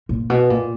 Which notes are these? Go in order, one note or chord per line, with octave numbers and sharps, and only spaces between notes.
A#2
B2
A#2